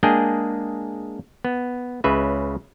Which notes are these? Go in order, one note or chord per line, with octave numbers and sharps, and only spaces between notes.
G#3 A#3 D4 G#4 G5
B3
C#2 C#3 B4 E5